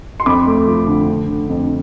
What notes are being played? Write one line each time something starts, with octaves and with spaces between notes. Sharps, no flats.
C6
F2 B5 D6
A3
F3
D3
D3
D3
F2